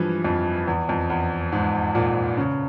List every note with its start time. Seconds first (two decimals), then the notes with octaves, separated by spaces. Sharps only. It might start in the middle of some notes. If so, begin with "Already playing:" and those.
Already playing: G2 E3 F3 G#3
0.25 F2
0.67 E2
0.89 F2
1.10 E2
1.52 G#2
1.95 A#2
2.37 C#3